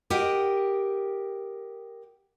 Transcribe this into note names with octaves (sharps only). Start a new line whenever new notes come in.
G4 A#4 D#5 F#5 G5